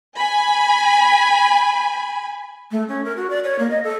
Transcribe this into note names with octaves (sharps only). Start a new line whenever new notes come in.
G#5 B5
A3
C#4
A#4
F#4
D5
C#5
A#3
D#5
A4